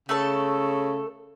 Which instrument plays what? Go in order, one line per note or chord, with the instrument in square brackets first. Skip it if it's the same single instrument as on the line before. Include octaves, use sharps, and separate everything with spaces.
[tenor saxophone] C#3 [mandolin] A3 A4 A5